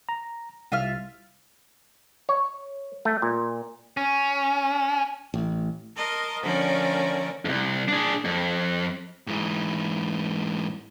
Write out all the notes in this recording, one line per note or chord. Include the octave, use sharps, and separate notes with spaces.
A#5
C2 F4 E5 F6
C#5
A3
A#2
C#4
A1
A#4 D#5 A5 C6
D3 F3 A3 C#4 A#4 D5
C2 F2
D4 G#4
F2
G#2 E3